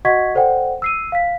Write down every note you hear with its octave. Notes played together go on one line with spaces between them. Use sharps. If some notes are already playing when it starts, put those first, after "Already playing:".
F#4 D#5 F#5 C#6 G#6 B6
A4 C5 D5 F#5 G5
E6 C7 D#7
F5 B6